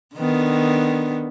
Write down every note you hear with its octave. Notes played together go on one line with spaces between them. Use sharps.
D3 D#3 B3